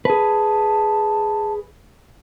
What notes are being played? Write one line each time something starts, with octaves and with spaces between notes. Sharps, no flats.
G#4 B4 A5